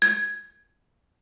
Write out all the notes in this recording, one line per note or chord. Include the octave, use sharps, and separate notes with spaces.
G#6